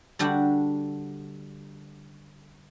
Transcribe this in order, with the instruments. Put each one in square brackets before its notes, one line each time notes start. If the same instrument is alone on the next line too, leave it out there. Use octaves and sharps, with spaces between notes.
[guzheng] D3 G3 D4 F#4 G4